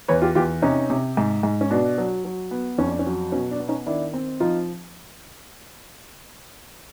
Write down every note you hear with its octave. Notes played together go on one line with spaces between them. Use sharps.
E2 B4 C#5
F4 G4
E2 F4 G4
C3 C#4 D#4
C3
G#2
G#2
C#4
B2 D4
F#3
F#3
B3
F2 C#4
D4
C#4
F#3
B2 C#4
D4
B3
C#4 D#4
D#3 D4 E4
C4
F3 D#4 F4